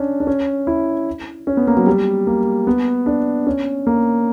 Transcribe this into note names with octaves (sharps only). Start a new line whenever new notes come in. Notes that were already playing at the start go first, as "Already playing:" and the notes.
Already playing: C#4 D4
D4
C#4
E4
C#4
B3
A#3
F#3
G3
A#3
B3
D4
C#4
A#3